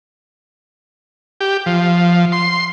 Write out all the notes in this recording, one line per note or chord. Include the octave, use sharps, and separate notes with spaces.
G4
F3
C6